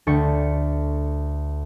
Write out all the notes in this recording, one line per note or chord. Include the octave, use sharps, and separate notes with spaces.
D2 A4 G5 C#6 C#7